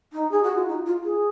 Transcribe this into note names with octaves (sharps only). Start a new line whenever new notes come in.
D#4
G#4
F#4
F4
D#4
F4
G#4